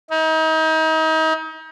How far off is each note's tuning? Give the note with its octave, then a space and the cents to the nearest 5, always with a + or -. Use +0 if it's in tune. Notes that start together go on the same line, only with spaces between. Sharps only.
D#4 +35